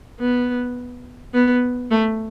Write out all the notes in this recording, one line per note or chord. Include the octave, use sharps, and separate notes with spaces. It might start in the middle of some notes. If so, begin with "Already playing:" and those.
B3
B3
A3